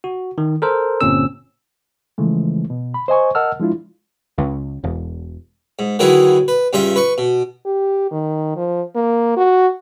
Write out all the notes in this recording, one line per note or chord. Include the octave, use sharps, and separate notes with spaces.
F#4
D#3
A4 A#4 C5
G1 A#2 C4 C#4 E6
C#3 E3 F3 G#3 A3
B2
B5
C5 D#5 G#5 C#6
A#4 D#5 F#5 A5 E6 F6
F3 G#3 D4 E4 F4
C#2
E1
G#2
D3 D#3 F#3 E4 G#4 B4
B4
G2 C#3 C#4 F4 E5 G5
B4 C#6
B2
G4
D#3
F3
A#3
F#4